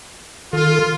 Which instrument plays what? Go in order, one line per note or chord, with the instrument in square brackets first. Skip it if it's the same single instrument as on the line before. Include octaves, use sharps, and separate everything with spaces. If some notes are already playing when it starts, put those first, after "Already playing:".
[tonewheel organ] D#3 A4 [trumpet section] F4